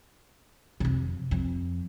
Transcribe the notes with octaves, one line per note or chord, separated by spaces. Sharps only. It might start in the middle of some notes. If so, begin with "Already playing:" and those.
F2 C3
F2